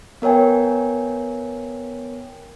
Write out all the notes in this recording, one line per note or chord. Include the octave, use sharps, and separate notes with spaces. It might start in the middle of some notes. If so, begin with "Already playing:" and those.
B3 A#4 C#5 G5 G#5